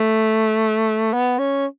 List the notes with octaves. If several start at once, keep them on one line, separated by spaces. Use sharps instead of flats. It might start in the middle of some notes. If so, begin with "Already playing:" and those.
Already playing: A3
B3
C#4